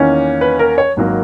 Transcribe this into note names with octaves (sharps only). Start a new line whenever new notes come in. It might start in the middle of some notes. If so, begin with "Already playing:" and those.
Already playing: E2 D#3 A#3 C#4
B4
A#4
C#5
G#1 G#2 D#3 F#3 A#3